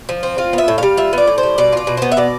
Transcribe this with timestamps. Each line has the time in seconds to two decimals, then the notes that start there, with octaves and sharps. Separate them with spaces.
0.09 F3
0.23 C4
0.38 F4 F5
0.53 B3 E5
0.68 A2
0.78 G3 F5
0.97 F4 E5
1.13 B3 D5
1.27 A2
1.38 C5
1.43 G3
1.58 B2 D5
1.73 F4 D5
1.87 B2
1.97 B3 C5
2.12 E5
2.17 B2 D5